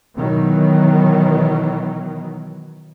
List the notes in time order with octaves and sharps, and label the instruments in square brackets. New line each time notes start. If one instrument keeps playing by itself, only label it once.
[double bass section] B2 D#3 E3 F#3